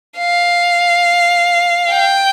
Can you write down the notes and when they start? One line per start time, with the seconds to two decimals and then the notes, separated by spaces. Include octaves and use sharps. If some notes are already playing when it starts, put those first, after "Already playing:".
0.18 F5
1.91 G5